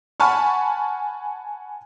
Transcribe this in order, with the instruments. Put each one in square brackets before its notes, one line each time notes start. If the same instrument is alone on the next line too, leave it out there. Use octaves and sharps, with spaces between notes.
[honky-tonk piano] F#5 G#5 A5 B5 C#6 F6